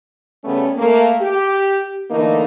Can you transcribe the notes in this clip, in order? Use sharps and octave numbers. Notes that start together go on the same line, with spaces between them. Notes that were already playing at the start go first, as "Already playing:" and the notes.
C#3 G3 A3 B3 C#4
A3 A#3
G4
D3 E3 A3 A#3 D#4